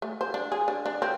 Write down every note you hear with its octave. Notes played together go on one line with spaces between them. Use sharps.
A3
C5
D4
G#4
D4
D4
C4